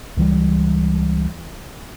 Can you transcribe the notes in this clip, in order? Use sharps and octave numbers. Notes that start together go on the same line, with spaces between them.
C#2 E3 G3